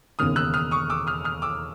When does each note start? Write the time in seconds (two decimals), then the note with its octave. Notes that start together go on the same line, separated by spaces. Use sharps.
0.19 E1 D#2 C#3 D#6 F6
0.36 E6 F#6
0.54 D#6 F6
0.71 C#6 D#6
0.90 D6 E6
1.07 D#6 F6
1.24 D#6 F6
1.42 D6 E6